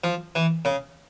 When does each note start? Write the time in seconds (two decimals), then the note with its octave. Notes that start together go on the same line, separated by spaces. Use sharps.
0.04 F3
0.35 E3
0.65 C#3